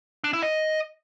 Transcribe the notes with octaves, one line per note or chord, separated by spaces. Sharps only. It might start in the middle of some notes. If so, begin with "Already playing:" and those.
D4
E4
D#5